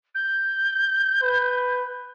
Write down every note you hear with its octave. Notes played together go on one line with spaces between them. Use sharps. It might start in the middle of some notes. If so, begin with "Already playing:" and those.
G6
B4